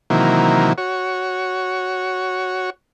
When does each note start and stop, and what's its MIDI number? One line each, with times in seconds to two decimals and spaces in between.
0.10 0.73 48
0.10 0.73 51
0.10 0.73 52
0.10 0.73 54
0.10 0.73 58
0.78 2.70 66
0.78 2.70 73